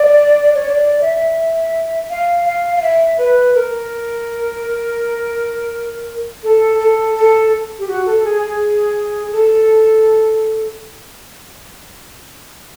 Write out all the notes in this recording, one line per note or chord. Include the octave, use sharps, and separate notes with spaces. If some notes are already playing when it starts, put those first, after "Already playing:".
Already playing: D5
C#5
D5
E5
F5
F5
F5
E5
B4
A#4
A4
A4
A4
G4
F#4
A4
G#4
G#4
A4